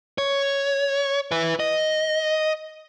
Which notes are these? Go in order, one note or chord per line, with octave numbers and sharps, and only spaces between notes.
C#5
E4 B4
D#5